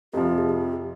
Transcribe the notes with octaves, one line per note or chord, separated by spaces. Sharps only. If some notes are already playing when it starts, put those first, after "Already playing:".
F2 C3 F3 G4
G#4
G4